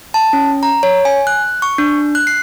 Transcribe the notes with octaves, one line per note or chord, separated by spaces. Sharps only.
A5
C#4
A#5
C#5
G#5
F#6
C#6
D4
F#6
C7